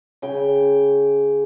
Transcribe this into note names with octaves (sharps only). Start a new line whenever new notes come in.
C#3 G5